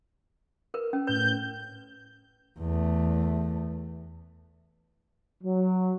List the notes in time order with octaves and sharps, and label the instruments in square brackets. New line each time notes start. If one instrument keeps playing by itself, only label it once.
[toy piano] A#4 B4
C#4
[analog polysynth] A2 G6 [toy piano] B4
[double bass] E2 A3
[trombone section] F#3